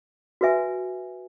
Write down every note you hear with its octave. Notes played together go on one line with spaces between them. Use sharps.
F#4 B4 E5 G#5